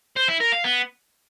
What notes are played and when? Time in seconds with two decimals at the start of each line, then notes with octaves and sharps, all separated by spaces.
0.17 C5
0.29 E4
0.41 A#4
0.52 F5
0.64 B3